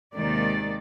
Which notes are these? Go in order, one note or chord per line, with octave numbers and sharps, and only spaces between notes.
D#2 C3 D#3 G#3 A#3 D5